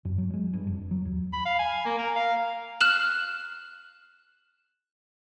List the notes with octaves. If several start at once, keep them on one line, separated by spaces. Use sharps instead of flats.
F#2
F#3
G#3
G2
F1
F#3
D#2
B5
F5
G#5
A#3
A#4
F5
F6 F#6 E7 F#7